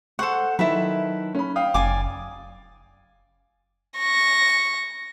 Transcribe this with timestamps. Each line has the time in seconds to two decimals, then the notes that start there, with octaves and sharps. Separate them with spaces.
0.19 A4 C5 F#5 C#6
0.59 D#3 F#3 E4 A4 B4
1.35 C#4 B5
1.56 F5 G5 D#6
1.74 F#1 D5 G#5 D6
3.98 C#6 A#6